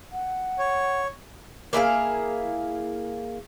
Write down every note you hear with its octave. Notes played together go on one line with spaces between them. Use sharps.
F#5
C#5
A#3 E4 G#4 F5